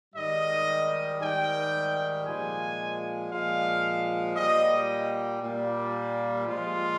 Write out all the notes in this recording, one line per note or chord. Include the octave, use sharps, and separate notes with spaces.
G#2 D#3 G3 D#5
G#2 D#3 G3 G5
A#2 F3 G#3 G#5
A#2 F3 G#3 F5
A#2 G3 D#5
A#2 G3
A#2 F3 G#3 F4